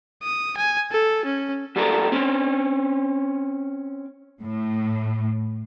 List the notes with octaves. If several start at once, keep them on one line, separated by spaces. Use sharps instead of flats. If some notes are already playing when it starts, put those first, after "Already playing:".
D#6
G#5
A4
C#4
F#3 G3 A4 A#4
C4 C#4
A2